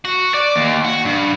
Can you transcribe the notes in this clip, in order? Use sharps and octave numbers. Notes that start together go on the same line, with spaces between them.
F#4
D5
D#2
F#4
G2